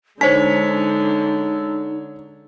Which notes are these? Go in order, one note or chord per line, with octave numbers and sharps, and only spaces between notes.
D3 G#3 D4 D#4 C5 C#5 B6